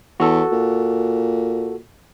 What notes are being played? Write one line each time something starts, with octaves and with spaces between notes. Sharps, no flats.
E2 F#4 A4
A#2